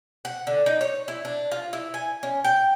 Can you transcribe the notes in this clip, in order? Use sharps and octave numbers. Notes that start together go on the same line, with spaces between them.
F#5
D3
D#4
C#5
E4
D4
F4
E4
G#5
C#4
G5